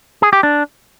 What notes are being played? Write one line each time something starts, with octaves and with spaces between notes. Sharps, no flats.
G#4
G4
D4